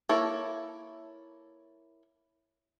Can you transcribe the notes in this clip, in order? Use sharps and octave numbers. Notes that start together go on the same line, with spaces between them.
A#3 E4 A4 C#5